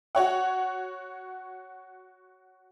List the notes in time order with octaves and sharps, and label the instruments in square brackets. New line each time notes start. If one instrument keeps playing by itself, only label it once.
[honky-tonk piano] F#4 C#5 F#5